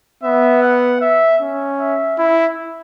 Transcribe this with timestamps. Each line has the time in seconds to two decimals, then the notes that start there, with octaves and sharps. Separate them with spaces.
0.23 B3 E5
0.62 F#5
1.01 E5
1.41 C#4
1.80 E5
2.19 E4